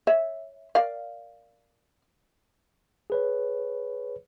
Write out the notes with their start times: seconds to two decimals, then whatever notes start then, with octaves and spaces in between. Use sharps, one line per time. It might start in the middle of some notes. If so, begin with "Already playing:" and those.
0.07 C#5 E5
0.75 A#4 D5 F5
3.10 G#4 B4 C#5